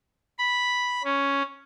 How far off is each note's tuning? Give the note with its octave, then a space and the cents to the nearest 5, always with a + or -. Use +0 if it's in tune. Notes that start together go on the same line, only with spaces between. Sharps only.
B5 -5
C#4 +5